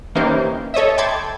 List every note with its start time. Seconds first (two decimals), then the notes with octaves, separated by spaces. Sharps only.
0.15 E3 A#3 C#4 D#4 G4 C5
0.74 A4 C#5 D#5 E5
0.98 G5 A5 B5 C6 D6 G#6